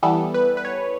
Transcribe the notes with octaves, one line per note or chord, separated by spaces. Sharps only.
E3 G3 B3 A4
B4
B4
C#5